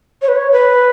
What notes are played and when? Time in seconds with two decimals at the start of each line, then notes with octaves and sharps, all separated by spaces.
0.22 C#5
0.28 B4
0.36 C#5
0.52 B4